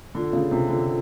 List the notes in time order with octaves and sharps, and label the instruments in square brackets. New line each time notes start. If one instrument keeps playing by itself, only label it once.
[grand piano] D3 [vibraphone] D4 F4 A4
[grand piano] C#3
C3
D3